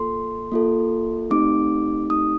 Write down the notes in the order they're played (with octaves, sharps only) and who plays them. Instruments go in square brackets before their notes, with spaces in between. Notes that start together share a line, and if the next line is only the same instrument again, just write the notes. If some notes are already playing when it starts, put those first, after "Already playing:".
Already playing: [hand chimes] A#3 F4 A4 C6
A#3 F4 A4
A3 C4 D#4 G4 D6
A3 C4 D#4 G4 D#6